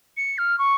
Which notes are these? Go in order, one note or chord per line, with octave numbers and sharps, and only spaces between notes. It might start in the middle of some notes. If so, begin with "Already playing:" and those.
C#7
F6
C#6